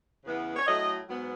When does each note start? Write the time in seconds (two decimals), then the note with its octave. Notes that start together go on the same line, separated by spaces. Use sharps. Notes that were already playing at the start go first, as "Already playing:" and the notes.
0.24 E2 C#3 E3 B3
0.56 C#5
0.66 A2 F#3 A3 D#5
1.08 G#2 F#3 B3